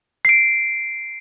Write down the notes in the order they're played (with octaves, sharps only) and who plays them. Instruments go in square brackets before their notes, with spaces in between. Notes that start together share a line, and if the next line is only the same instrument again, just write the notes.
[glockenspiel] C7 D7